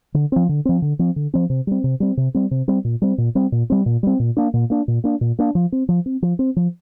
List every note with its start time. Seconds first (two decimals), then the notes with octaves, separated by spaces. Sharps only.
0.14 D3
0.32 F3 C4
0.49 D3
0.65 F3 C4
0.82 D3
0.99 F3 C4
1.16 D3
1.34 F3 C4
1.50 C3
1.67 G3 C4
1.84 C3
2.00 G3 C4
2.17 C3
2.34 G3 C4
2.51 C3
2.68 G3 C4
2.85 A#2
3.02 G3 C4
3.18 A#2
3.35 G3 C4
3.52 A#2
3.70 G3 C4
3.86 A#2
4.03 G3 C4
4.19 A#2
4.37 A#3 D4
4.54 A#2
4.70 A#3 D4
4.88 A#2
5.04 A#3 D4
5.21 A#2
5.39 A#3 D4
5.55 F3
5.72 C4
5.89 F3
6.06 C4
6.22 F3
6.39 C4
6.56 F3